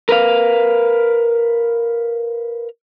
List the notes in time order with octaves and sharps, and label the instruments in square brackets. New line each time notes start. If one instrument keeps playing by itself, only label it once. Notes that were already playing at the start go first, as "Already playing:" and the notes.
[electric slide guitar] A#4 B4 F5